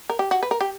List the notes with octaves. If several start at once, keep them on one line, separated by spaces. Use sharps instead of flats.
A#4
G4
F#4
B4
A#4
G4